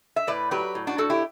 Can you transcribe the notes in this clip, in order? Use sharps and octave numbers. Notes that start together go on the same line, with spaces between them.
E5
A2 B4 D5
F#3 G4 B4
A2
D4 F#4
A2 F#4 A4
E4 G4